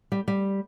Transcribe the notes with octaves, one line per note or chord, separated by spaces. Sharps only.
G3
G3